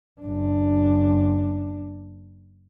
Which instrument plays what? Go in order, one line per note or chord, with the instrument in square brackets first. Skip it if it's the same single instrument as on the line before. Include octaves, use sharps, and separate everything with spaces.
[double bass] F#1 D4